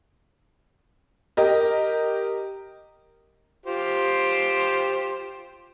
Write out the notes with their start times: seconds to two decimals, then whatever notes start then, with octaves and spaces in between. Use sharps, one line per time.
1.37 G4 A#4 D#5
3.66 F4 G4 C5